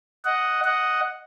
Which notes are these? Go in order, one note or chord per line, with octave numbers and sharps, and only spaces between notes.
D#5 F#5
D#5 F#5